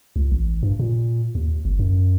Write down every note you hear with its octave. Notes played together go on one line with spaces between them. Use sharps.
C#2
A1
G2
A#2
D#2
G1
F#2